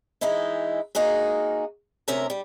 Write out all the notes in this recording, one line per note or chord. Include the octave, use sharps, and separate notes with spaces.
E3 G#3 D#4 E4
A#3 D#4 F#4 G#4 A#4
D2 C3 C#4 A#4 E5 A#5
G3